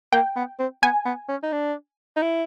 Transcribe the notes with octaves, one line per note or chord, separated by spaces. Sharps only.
A#3 G5
B3
C4
B3 G#5
B3
C#4
D#4
D4
D#4
E4